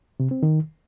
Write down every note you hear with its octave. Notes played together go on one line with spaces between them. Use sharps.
C3
C4
D#3